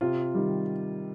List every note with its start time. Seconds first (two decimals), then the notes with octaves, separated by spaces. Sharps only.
0.01 C3 F4
0.35 D#3 G3